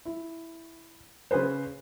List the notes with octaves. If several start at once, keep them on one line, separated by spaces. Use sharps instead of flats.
E4
C#3 C#4 G#4 B4 C5